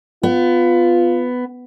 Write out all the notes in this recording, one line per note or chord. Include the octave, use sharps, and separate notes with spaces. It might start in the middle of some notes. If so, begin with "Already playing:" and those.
B3 F4